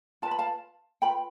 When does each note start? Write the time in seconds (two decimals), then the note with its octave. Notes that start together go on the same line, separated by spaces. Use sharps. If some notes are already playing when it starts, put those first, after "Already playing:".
0.22 F4 B4 A5
0.31 B5
0.38 F5 A5
1.02 F4 B4 G5 B5